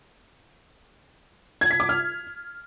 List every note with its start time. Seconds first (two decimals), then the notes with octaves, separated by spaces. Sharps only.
1.61 G#6
1.71 B6
1.80 D6
1.89 F6